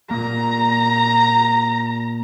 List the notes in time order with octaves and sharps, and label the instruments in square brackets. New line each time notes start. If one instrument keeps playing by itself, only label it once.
[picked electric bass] A#2 A#3 [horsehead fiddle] A#5